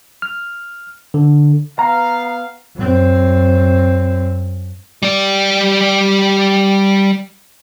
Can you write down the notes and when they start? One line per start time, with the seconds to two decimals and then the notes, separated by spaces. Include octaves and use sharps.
0.22 F6
1.14 D3
1.79 B3 F5 A#5
2.75 F#2 C4
5.03 G3 D5